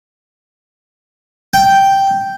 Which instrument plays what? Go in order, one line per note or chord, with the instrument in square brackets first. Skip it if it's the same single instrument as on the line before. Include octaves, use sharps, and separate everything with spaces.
[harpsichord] G5